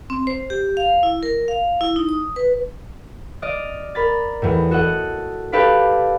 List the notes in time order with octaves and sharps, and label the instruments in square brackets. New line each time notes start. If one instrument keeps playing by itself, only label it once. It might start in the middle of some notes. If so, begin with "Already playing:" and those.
[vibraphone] C4
C5
G4
F5
E4
A#4
F5
E4
D#4
D#6
B4
[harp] D5 D#5 F6
A#4 B5 A6
E2 A2
F#4 A4 D#5 F#5
G4 A4 B4 D5 F5 B5